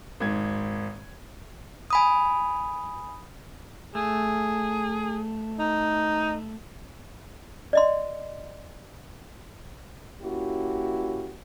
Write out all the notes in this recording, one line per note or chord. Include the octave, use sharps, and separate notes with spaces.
G#1 G#2 G#6
G#5 B5 D#6
A3 G#4
D#4
D5 D#5 C6
A#3 C#4 E4 F#4 G4